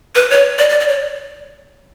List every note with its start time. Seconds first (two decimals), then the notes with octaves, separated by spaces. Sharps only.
0.15 B4
0.31 C#5
0.59 D5
0.69 D5
0.80 D5
0.88 C#5